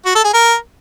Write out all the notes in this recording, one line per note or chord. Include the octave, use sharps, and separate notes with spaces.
F#4
A4
G#4
A#4